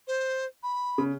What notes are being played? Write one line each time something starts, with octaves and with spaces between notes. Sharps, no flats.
C5
B5
C#3